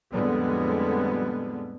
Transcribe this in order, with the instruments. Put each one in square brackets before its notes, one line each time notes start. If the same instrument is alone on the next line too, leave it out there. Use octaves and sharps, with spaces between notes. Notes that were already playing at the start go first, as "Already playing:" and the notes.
[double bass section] F2 A2 D3 G3 G#3 B3